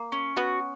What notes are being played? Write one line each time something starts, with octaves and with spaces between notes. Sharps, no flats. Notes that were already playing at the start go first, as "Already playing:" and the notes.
Already playing: A#3
C#4
B3 F#4